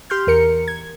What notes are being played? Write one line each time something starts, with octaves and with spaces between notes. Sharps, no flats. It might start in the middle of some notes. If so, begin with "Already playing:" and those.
G4 C6 F6 G6
E2 A#4 C#7
G#6